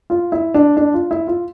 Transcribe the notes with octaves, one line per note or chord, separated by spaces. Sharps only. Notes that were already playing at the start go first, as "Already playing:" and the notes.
F4
E4
D4
D4
F4
E4
F4